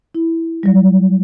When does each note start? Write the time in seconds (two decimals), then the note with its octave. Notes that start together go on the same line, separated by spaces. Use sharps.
0.15 E4
0.63 F#3 G3